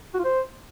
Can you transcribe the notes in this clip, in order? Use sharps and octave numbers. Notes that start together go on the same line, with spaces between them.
F#4
F4
C5